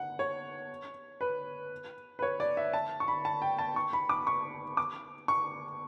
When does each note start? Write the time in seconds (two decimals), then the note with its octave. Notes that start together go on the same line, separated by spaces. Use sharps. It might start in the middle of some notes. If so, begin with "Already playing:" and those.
Already playing: F#5
0.19 C#5
1.21 B4
2.19 B4
2.22 C#5
2.40 D5
2.57 E5
2.74 A5
3.00 C#6
3.08 B5
3.25 A5
3.42 G5
3.59 A5
3.76 C#6
3.93 B5
4.09 D6
4.27 C#6
4.77 D6
5.28 C#6